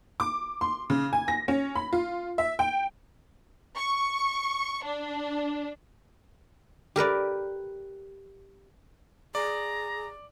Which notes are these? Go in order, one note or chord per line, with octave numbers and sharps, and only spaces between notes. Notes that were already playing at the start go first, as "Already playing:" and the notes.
D6
C6
C#3
G#5
A#6
C#4
B5
F4
E5
G5
C#6
D4
G4 A#4 B4 D5
G#4 D5 A#5